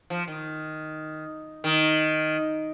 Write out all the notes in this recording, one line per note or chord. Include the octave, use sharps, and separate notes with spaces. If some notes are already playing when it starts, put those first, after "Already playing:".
F3
D#3
D#3